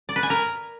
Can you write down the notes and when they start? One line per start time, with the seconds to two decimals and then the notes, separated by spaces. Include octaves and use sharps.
0.09 D5
0.16 B4
0.23 G#5
0.30 A#4